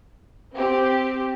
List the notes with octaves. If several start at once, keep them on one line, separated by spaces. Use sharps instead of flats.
C4 G4